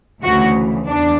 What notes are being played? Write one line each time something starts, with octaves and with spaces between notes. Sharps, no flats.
D2 C#3 E3 F#4
E2 D4